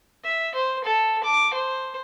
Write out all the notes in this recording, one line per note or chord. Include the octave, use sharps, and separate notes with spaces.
E5
C5
A4
D6
C5